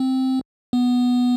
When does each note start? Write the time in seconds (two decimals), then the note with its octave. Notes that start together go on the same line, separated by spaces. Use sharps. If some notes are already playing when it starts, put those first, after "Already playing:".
Already playing: C4
0.73 B3